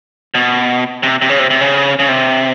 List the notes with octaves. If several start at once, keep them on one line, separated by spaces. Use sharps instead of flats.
B2
C3
C3
C#3
C3
C3
C#3
C#3
C3